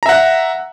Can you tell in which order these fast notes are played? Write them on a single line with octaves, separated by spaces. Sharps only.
A#5 E5 F#5